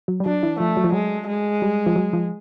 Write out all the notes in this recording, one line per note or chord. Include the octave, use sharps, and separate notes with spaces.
F#3
G3
F#3 D4
E3
F3 A3
F#3
F3
F#3 G#3
G#3
G3
F3
F#3
F3